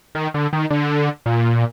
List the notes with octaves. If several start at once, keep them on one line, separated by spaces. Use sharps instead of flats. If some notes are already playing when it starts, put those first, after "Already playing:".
D#3
D3
D#3
D3
A#2